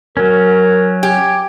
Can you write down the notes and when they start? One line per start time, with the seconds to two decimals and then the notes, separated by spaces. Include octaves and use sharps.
0.17 F#3 C#4 A#4
1.03 G4 G#5